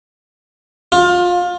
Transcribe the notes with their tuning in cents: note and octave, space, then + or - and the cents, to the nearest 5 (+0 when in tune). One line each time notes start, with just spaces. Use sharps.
F4 +25